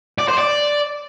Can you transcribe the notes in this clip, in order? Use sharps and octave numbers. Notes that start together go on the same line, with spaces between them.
D5
C5
D5